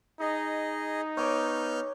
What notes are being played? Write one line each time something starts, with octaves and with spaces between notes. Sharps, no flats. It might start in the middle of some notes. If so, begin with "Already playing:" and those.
D#4 G#4 D#5
B3 C#5 G#5 D6 F6 G6